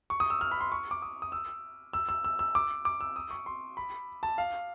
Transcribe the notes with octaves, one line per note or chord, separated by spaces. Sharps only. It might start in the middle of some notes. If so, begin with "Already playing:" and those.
C#6
D#6
E6
F6
B5
C6
C#6
D6
D#6
D#6
E6
E6
E6
E6
E6
D6
D6
E6
D#6
C#6
C6
B5
A5
F5